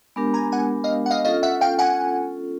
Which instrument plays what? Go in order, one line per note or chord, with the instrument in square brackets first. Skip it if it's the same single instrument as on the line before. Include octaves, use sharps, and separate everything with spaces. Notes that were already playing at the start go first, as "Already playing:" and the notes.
[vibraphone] G#3 B3 D4 G4 A#4
[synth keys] G#5 A#5
F#5 G#5
D#5 F5
F#5
D#5 F5
[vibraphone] C#4 F4 A4 [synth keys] D#5 F5
[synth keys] E5 F#5
F5 G5
F#5 G#5